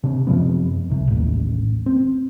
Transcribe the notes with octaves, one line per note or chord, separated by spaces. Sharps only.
C3 D4
F#2 C3 F3 B3
C2 C3
A1 D#2
C4